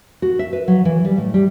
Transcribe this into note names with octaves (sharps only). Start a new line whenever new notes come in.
F#4
E5
B4
F#3
E3
G3
A2
G3